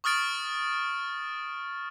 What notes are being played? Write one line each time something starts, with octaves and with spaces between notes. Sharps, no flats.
C#6 D#6 F6 A6 D7